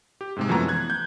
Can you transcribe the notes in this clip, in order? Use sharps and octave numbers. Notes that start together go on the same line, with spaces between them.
G4
G#2 C3 G#3
F#2 E3 F3 A3 B3 A#5
F#6 G#6
G6